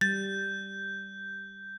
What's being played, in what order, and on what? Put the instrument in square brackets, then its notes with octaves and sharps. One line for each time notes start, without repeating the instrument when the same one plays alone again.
[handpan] G3 [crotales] G6 [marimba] A6